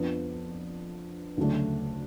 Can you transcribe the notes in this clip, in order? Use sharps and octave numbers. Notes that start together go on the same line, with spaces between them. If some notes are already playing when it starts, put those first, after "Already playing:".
Already playing: F2 F3 B3 D4
D2 C#3 F#3 A3 D4